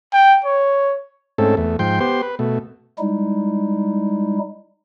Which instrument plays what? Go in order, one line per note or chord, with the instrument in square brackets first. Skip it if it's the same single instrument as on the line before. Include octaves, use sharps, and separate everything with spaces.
[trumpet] G5
C#5
[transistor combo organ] G#2 A3 C4 C#4 A4
E2 A3
G#2 F3 G5 C6
B3 G4 C5 C6
B4
B2 A3
[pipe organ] G3 G#3 D#4 E4